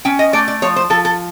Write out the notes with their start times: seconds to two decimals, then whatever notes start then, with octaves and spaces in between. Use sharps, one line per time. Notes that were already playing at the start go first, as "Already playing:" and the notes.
0.05 C#4 G5
0.19 D#5
0.33 A3 D5
0.48 D5
0.62 F3 C#5
0.76 C5
0.90 F3 A4
1.05 A4